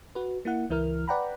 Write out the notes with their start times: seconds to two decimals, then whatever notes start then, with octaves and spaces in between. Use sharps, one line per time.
0.15 F#4 B4
0.45 A#3 E4 F#5
0.70 C#2 E3 E4 A#4 F6
1.08 B4 D5 F#5 G5 A#5 B5